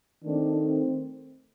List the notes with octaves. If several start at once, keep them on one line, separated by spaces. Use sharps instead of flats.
D#3 A3 C4 D4
C4